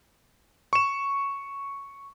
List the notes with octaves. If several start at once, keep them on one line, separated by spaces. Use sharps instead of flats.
C#6 E7